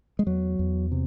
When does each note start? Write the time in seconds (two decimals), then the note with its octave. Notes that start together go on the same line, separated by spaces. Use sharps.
0.19 G#3
0.26 E2 F#3
0.59 E2
0.92 C3